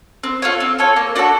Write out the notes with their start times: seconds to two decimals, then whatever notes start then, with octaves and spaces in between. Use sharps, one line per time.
0.24 C4
0.42 F4 A4 C#5
0.60 C4
0.79 F4 A4 C#5
0.96 A#3
1.15 D4 F#4 A4